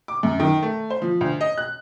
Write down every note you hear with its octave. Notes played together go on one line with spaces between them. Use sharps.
D6
F#2
D#3
A3
C5
F3
D2
D#5
F#6